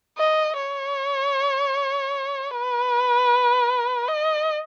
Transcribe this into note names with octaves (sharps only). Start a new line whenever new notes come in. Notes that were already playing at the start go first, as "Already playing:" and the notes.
D#5
C#5
B4
D#5